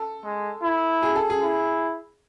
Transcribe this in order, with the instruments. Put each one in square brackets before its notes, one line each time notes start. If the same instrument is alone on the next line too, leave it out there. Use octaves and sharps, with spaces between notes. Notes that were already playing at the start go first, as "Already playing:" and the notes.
Already playing: [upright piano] A4
[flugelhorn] G#3
E4
[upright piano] G#4
A4
G#4
[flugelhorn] E4